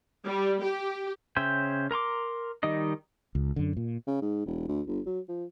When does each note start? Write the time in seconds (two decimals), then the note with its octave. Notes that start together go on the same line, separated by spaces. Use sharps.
0.25 G3
0.62 G4
1.36 C#3 C#4 C5 E5 G5
1.91 A#4 A#5 C6 D6
2.63 D#3 G3 D#4 D#5
3.35 C#2
3.56 F#2 D3
3.77 A#2
4.07 C#3
4.22 G#2
4.46 E1
4.68 D2
4.87 G1
5.06 F#3
5.28 F3